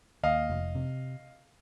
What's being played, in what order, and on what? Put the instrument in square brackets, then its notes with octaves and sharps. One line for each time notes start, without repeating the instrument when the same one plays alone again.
[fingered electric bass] D#2 [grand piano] D#5 F5
[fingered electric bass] F1
C3